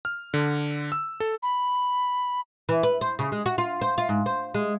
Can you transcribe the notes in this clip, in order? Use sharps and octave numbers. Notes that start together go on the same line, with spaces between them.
F6
D3
E6
A4
B5
E3
B4
C5
C#3
G#3
F#4
F4
C5
F4
G#2
C5
G#3